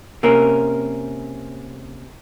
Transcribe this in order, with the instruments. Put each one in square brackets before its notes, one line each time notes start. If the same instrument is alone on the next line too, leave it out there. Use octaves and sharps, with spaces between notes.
[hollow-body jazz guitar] C3 A#3 C4 C#4 A#4